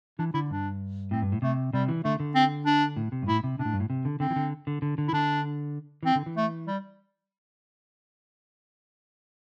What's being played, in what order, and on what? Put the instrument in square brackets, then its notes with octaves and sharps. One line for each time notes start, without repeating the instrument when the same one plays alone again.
[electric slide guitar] E3 [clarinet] D4
[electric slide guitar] D3 [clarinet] E4
[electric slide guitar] G2 [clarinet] D4
[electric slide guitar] A2 [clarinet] C4
[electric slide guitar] G2
A2
[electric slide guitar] C3 [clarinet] A3
[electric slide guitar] C3 [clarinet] G3
[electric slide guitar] E3
[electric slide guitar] D3 [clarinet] A3
[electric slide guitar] D3
[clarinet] C4
D4
[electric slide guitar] A2
C3
G2
[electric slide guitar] A2 [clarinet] E4
[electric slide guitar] C3
[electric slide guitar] C3 [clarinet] D4
[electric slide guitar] A2
G2
A2
C3
D3
[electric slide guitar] D3 [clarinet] C4
[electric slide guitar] E3
D3
D3
D3
D3
[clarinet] E4
[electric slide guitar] D3 [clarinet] D4
[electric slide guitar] E3 [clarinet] C4
[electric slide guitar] D3
E3
[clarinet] A3
G3